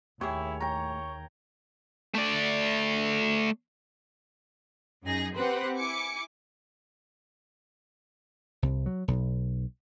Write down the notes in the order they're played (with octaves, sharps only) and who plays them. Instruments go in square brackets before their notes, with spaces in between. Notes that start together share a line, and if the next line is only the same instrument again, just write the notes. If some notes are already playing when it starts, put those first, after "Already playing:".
[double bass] D#2 [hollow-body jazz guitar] A2 G4 G#4 [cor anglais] E4 [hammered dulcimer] C#5
[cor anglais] C#5 [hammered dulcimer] G5 A#5
[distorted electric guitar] A3 D5
[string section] F#2 D#4 G#4 A#6
C4 G4 B4 C5 F#5
E4 G#5 D6 C#7
[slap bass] C2
F#3
B1